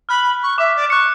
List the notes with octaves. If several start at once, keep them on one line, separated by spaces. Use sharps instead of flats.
B5 F6 F#6
C#6
E5 D6
D5
C#6 F#6 C#7